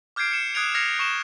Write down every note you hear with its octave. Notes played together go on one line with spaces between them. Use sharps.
D6 F6 G6 G#6 C7 D7
C#7 E7
D#6 F#6 G#6 C7 D7 F7
F6 G#6 A#6 C7 C#7 F7
C#6 E7 G7